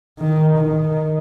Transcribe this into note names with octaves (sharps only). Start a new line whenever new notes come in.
D#3
D#3